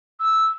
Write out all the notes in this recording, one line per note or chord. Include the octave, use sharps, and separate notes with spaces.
E6